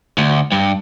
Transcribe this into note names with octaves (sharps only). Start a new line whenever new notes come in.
D2
G2